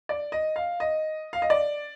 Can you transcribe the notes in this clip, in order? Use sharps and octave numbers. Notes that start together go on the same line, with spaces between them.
D5
D#5
F5
D#5
F5
D#5
D5